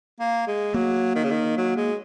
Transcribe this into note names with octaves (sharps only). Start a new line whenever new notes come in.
A#3
G#3
F#3 A#3
D#3
C#3
D#3
F#3
G#3